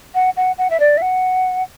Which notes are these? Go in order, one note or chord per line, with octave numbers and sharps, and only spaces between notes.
F#5
F#5
F#5
E5
D5
E5
F#5